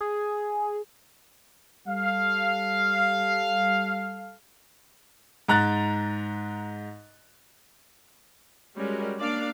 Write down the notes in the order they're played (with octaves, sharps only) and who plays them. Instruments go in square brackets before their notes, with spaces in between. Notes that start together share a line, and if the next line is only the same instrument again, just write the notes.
[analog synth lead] G#4
[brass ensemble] G3 A4 F5
[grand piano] G#2 A#5 F#6 A6
[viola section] G3 G#3 C#4 F#4 A#4
A#3 D4 D5 F5